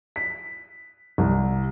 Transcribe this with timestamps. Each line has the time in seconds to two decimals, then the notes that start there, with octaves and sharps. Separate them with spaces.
0.16 B6
1.18 C2